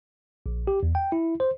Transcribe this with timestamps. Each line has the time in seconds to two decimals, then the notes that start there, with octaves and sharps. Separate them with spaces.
0.46 A#1
0.67 G4
0.83 E2
0.95 G5
1.12 E4
1.40 C5